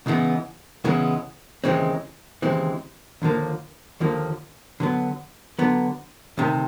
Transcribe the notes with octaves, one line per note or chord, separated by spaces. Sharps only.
C#2 C#3 E3 G#3 B3
C#2 C#3 E3 G#3 B3
D#2 C#3 E3 G#3 C4
D#2 C#3 E3 G#3 C4
D#2 D3 F3 A#3
D#2 D3 F3 A#3
D3 F#3 B3
D3 F#3 B3
D2 C3 D#3